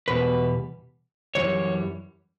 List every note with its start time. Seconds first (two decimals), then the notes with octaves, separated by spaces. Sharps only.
0.08 E2 B2 G3 B4
1.35 F#2 C#3 E3 G3 C#5